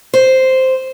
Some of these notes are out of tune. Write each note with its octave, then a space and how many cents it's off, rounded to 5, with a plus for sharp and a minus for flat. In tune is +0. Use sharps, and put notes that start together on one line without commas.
C5 -5